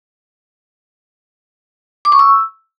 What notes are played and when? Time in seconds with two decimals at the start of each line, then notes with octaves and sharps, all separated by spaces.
2.05 D6
2.12 C#6
2.19 E6